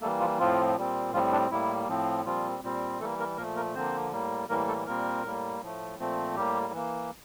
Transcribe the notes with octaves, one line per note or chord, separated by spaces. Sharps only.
E3 G3 A3 A#3 A4
F3 F4
A2 F3 C4 F4
A#2 G3 C4
A2 F3 G3 C4 F4
D4
A2 G3 A#3 E4
A2 F3 C4
A#2 F3 G3 C4 F4
A#2 G3 C4
E3 G3 A3 A#3 A4
A#3 A#4
A#2 F3 A3 A#3 A#4
A#3 A#4
D3 F3 A#3 C4 C5
A2 G3 A#3
A2 E3 G3 A#3 A#4
A3 A4
A#2 G3 A#3 C4 A#4
A2 G3 A#3
A2 F3 A3
A#2 F3 A3 C4
A2 G3 A#3 G4
E3 A#3